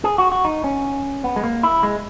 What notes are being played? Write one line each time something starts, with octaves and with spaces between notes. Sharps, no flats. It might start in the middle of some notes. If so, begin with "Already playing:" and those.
G#4
F#4
F#4
D#4
C#4
B3
G#3
A#3
E4
G#3